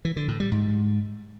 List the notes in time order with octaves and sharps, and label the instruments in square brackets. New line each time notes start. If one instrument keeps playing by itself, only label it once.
[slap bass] E3
D3
A2
G3
G#2